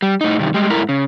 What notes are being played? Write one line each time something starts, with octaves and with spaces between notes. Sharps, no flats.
G3
A2 D#4
G2 C3 D#3
G3 G#3
G#2 A3 E4 A#4
C#3